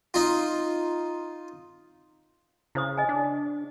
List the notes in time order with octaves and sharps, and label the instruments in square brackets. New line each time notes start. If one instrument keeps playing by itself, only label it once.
[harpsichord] D#4 F4
[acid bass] C#3 [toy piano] E4 C5 D#6
[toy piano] D#5 G#5
[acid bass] D4